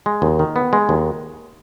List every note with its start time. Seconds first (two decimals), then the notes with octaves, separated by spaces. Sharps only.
0.06 G#3
0.22 D#2
0.39 D#3
0.56 B3
0.73 G#3
0.89 D#2